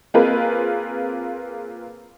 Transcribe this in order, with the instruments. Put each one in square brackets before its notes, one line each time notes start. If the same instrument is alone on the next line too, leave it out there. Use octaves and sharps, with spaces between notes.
[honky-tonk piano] A#3 C4 F4 G#4 A#4 B4